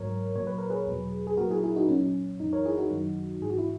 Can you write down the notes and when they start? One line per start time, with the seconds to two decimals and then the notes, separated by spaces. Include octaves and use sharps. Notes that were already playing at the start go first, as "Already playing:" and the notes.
Already playing: G#2 F#3 A#4 C#5
0.35 A#2 F#3 C#5
0.47 B4
0.58 A#4
0.70 G#4 B4
0.86 E2 B2 F#3
1.27 G#4
1.37 A#2 F#3 F#4 A#4
1.50 E4 G#4
1.63 E4 G#4
1.76 D#4 F#4
1.88 A#2 F#3 C#4
2.40 F#2 E3 D#4
2.53 A#4 C#5
2.66 E4 G#4
2.78 D#4 F#4
2.91 F#2 D#3 F#3
3.42 G#2 E3 G#4
3.50 F#4
3.58 E4